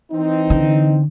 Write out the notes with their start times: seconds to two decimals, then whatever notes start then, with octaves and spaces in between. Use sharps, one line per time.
0.12 E3 C4 D#4
0.50 D3